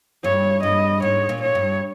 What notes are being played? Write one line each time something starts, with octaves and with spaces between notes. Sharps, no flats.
G2 C#5
G2 D#5
G#2 C#5
A#2
C#5
G2